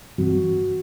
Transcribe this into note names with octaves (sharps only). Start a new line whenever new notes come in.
G2 E3 G3 C4 F#4